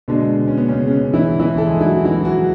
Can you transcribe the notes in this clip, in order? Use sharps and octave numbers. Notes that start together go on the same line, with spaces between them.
B2 D3 G#3 D4
C#4
B3
C#3 C#4
C#3 C#4
E3 E4
E3 E4
A4
G#3 G#4
E4
F#3 F#4
E3 E4
F#3 F#4